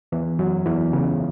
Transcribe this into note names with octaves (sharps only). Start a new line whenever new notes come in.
E2 E3
F#2 F#3
E2 E3
C#2 C#3